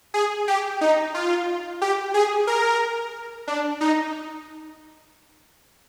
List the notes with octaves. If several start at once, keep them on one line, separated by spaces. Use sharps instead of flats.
G#4
G4
D#4
F4
G4
G#4
A#4
D4
D#4